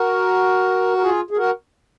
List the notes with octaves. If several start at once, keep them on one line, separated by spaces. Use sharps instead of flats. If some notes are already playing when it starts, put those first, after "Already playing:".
Already playing: F#4 A#4
A#4
F4 G#4
G#4
F#4 A#4